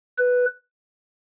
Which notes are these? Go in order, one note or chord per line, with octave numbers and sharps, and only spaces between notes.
B4